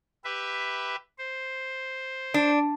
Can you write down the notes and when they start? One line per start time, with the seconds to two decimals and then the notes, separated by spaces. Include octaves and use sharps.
0.24 G4 B4 E5
1.18 C5
2.34 D4